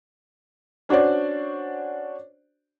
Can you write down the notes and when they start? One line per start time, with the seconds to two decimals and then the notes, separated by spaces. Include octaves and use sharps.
0.89 C#4 D4 F#4 C5 D5